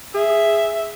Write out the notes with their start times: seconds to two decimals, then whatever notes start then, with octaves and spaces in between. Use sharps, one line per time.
0.15 G#4 E5